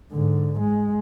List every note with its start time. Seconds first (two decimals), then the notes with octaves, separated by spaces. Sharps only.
0.12 G#2 D3
0.60 G#3